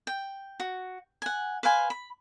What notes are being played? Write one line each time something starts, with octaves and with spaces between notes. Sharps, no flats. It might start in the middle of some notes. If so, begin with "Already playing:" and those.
G5
F#4
F#5 G#5
B4 C5 F5 G#5
B5